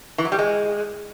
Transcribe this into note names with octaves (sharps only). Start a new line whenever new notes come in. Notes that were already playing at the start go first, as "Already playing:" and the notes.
E3
F#3
G3
G#3